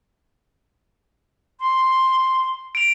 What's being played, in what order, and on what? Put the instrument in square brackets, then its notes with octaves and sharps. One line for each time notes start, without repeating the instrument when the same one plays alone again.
[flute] C6
[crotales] D7 F7